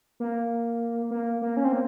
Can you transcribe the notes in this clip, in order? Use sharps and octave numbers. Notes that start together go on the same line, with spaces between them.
A#3
A#3
A#3
C#4
C4
A#3